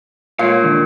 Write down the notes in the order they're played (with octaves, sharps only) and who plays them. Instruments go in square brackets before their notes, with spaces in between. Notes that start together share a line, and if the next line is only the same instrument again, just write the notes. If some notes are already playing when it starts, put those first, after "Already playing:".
[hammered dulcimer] A#2 [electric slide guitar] G#3 C#5 F5
[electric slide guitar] D3 D#3